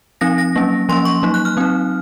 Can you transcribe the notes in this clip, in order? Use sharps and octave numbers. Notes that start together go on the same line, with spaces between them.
F3 C4 D#4 A#6
A#6
F#3 A#3 C#4
F3 A#3 C#4 C6
C#6
F#3 A#3 D#4
F#6
F6
F#3 C4 D#4